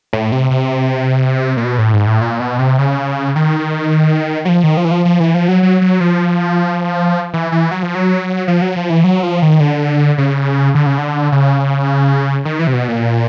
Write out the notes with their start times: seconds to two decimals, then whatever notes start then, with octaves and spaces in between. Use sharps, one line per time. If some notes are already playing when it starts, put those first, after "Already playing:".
0.13 A2
0.32 C3
0.51 C3
1.57 A#2
1.64 B2
1.78 A2
1.93 G#2
2.07 A2
2.21 A#2
2.40 B2
2.59 C3
2.78 C#3
3.36 D#3
4.45 F#3
4.49 F3
4.64 D#3
4.77 F3
4.85 E3
4.91 F3
5.05 F3
5.20 E3
5.34 F3
5.48 F#3
5.63 F#3
5.81 F#3
6.00 F3
7.33 E3
7.52 E3
7.71 F#3
7.83 F3
7.95 F#3
8.48 F3
8.62 F#3
8.76 F3
8.90 E3
9.04 F#3
9.23 F3
9.42 D#3
9.60 D3
10.18 C#3
10.75 D3
10.86 C#3
10.98 D3
11.32 C#3
12.45 D#3
12.59 E3
12.67 C3
12.73 B2
12.88 A#2